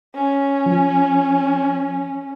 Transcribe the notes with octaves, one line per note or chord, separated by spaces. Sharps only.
C#4
F3